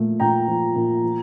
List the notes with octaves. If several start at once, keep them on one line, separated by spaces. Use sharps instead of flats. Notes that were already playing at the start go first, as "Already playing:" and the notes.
Already playing: A#2 F3 A3
A#2 G5 A#5
F3
A#2
F3